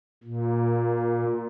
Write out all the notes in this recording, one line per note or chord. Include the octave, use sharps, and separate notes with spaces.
A#2